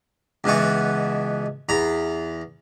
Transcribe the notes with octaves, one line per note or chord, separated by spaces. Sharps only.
C#2 B2 E3 F#4
E2 A#5 B5